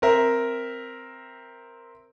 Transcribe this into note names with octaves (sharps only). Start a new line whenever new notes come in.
C4 A#4 E5